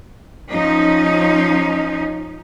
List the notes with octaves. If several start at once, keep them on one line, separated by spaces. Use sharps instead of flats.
F3 C#4 D#4